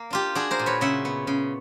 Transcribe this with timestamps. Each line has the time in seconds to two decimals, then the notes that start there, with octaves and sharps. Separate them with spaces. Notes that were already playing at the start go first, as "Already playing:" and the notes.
Already playing: A#3
0.10 D4 F4 G4
0.35 D4 F#4 G#4
0.51 A#4 C5
0.59 A#2
0.66 B4 C#5
0.81 C#3 E5 F#5
1.05 B3
1.27 C#3